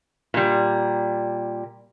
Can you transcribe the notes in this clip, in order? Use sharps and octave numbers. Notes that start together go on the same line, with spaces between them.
A#2 G3